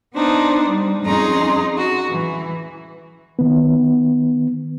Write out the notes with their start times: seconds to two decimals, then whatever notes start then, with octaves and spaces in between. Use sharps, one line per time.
0.13 B3 D4 D#4 C5
0.64 G3
1.03 F2 C#4 D#4 G#4 A#5 C6
1.78 F#4
2.09 E3
3.39 D#3 B3